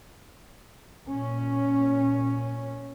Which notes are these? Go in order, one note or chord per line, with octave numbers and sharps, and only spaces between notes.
A#2 C#4